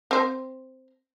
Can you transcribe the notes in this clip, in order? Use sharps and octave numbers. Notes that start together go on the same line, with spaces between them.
C4 C5